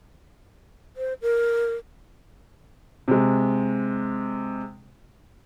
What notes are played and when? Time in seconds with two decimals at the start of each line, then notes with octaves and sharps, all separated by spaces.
0.97 C5
1.22 A#4
3.08 C3 G#3